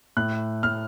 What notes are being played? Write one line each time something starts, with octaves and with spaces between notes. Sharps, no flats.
A2 F#6
A2 F6